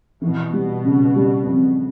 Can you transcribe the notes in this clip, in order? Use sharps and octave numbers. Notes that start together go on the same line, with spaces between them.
B2 E3
G3
C#3
G3
F2